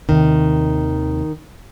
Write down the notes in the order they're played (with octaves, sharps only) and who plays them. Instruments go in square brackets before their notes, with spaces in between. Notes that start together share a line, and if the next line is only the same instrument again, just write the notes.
[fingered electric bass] D#2 C3 [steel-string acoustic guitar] D#3